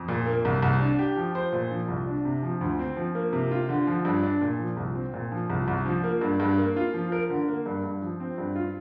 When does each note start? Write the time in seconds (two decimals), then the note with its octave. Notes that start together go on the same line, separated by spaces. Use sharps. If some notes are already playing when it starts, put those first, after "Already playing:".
Already playing: F2
0.08 A#2
0.26 A#3
0.45 C2
0.63 C2
0.80 D4
0.99 G4
1.17 F3
1.35 C5
1.53 A#2
1.71 F3
1.89 C2
2.07 D4
2.25 C3
2.43 F3
2.61 D2
2.79 C4
2.97 F3
3.15 A#3
3.33 C3
3.51 F4
3.69 D3
3.87 F3
4.05 G2
4.23 D4
4.41 A#2
4.60 F3
4.77 C2
4.95 C4
5.14 A#2
5.32 F3
5.50 C2
5.68 C2
5.85 F3
6.04 A#3
6.21 G2
6.40 G2
6.58 A#3
6.76 F4
6.94 F3
7.12 A#4
7.30 D3
7.48 A#3
7.66 G2
7.84 G2
8.02 F3
8.20 C4
8.38 G2
8.56 F4